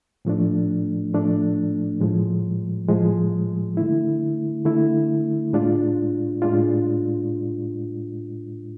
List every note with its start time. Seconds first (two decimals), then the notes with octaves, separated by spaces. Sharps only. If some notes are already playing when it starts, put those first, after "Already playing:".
0.25 A2 F3 A3 D4
1.13 A2 F3 A3 D4
2.01 A2 F3 G#3
2.89 A2 F3 G#3
3.77 D3 A3 E4
4.65 D3 A3 E4
5.53 A2 G#3 D4 F4
6.42 A2 G#3 D4 F4